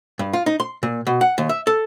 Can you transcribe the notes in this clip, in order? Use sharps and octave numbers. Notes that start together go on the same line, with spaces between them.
G2
F4
D#4
C6
A#2
B2
F#5
D#2
E5
A4